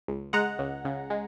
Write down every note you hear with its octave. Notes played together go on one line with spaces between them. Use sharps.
C#2
G#3 F#5 A#5
C#2
C#3
G#3